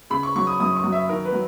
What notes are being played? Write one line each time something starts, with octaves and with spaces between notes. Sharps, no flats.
C#3 B5
C#6
F#3 C#6
D#6
F#2 D#6
C#6
F#2
E5
D#3 A#4
B4
F#3